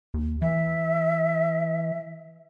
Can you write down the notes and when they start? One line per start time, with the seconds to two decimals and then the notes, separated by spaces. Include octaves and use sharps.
0.14 D#2
0.42 E3 E5